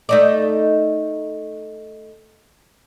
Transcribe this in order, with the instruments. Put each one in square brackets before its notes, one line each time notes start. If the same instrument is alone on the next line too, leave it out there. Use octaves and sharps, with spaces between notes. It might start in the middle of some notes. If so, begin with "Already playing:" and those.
[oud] A3 D#4 D5